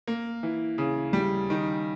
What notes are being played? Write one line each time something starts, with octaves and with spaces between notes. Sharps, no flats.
A#3
E3
C#3
G3
D#3